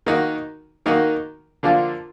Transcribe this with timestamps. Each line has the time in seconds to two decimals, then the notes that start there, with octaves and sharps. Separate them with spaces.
0.06 D#3 A#3 D#4 F#4
0.86 D#3 A#3 D#4 F#4
1.63 D3 F3 A#3 D4 F4